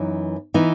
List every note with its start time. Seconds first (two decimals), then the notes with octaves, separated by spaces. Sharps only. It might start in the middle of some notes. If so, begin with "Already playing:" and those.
Already playing: F#2 E3 B3 D#4
0.54 E3 B3 D#4